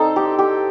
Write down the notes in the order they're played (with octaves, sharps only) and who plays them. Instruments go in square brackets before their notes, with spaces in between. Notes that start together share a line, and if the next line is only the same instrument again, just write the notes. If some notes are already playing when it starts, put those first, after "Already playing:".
Already playing: [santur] C4 D#4 [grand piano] A4
[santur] G4
G4